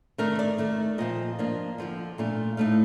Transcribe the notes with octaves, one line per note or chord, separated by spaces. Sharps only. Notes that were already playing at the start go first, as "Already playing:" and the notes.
D#3 A3 D4 A#4
D5
D#3 A3 D#4
A#2 F3 C4 D#5
F3 A#3 D4 F4
D3 F3 C4 F4
A#2 A3 D4 F4
A2 A3 D#4 F5